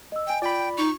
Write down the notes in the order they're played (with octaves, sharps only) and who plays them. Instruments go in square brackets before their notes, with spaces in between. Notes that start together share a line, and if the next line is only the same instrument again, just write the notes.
[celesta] D#5 E6
[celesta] D#5 G#5 [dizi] G5
[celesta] F4 [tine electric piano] D5 B5 [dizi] G5
[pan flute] D#4 [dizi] C#6